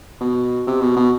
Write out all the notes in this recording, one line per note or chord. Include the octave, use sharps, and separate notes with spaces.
B2
C3
B2
B2